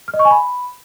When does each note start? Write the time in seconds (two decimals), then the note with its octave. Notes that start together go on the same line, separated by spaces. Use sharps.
0.08 F6
0.14 D#5
0.19 C#6
0.25 G#5
0.31 B5